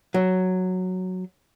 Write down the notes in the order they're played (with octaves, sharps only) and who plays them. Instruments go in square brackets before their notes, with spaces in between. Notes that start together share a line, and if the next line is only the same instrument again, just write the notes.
[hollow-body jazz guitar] F#3